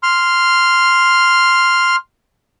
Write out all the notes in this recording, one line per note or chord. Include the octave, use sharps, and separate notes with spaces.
C6 F6